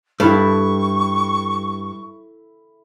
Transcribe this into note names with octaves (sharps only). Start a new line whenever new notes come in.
G2 E4 A4 C#6